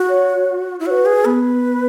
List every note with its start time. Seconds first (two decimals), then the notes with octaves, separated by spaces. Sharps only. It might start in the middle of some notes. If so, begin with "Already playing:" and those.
Already playing: F#4
0.09 C#5
0.80 E4
0.86 F#4 C#5
0.91 B4
1.06 G#4
1.25 B3 B4